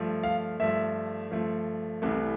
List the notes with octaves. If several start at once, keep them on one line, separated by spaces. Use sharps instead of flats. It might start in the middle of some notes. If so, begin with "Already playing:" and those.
Already playing: G2 F3 A3
F5
G2 F3 A3 E5
G2 F3 A3
C2 C3 E3 A3